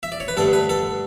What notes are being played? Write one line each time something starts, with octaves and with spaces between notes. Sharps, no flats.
E5
D5
C#5
B4
G2 D3 A3 A4
B4
A4